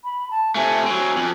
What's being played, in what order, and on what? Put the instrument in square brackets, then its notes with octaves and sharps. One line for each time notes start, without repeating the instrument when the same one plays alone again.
[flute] B5
A5
[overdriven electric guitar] C3 A3 [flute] G#5
[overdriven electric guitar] F#3 C4
F2